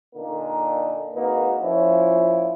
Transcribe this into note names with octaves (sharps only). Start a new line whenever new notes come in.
A#2 D3 A#3 D#4 A4 A#4
G#1 A#3 D#4 F#4 B4
A#2 F3 C#4 E4 F4